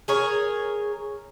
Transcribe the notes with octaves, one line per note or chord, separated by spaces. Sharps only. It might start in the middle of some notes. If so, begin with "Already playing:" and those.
G#4 A#4 C#5